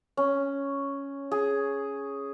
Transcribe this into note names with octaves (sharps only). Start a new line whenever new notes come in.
C#4
G#4